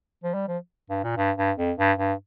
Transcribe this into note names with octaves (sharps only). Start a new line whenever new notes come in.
F3
G3
F3
G2
A#2
G2
G2
F2
G2
G2